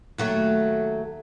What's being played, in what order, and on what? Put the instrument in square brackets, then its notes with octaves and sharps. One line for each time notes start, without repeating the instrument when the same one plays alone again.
[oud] D#2 F#3 A3